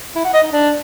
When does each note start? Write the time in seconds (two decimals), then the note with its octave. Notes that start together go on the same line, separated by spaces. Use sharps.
0.15 E4
0.24 F#5
0.34 D#5
0.43 D#4
0.52 D4